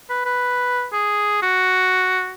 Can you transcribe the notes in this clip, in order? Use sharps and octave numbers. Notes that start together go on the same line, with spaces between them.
B4
B4
G#4
F#4